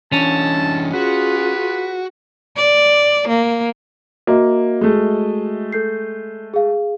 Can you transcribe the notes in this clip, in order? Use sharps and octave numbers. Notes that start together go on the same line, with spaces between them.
E3 C#4 D4 A5
F4 F#4 G#4 B4
D5
A#3
A#3 F#4 D#5 E5
G#3 A3
A4 G6 C7
G#4 F5